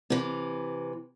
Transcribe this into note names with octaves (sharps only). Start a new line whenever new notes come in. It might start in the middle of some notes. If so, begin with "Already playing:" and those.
C3 E3